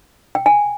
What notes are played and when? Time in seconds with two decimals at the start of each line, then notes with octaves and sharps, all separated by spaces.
0.35 G5
0.46 G#5